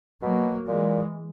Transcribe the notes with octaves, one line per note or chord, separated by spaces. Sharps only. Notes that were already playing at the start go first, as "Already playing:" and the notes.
B2 F#3 A#3
A#2 E3 G#3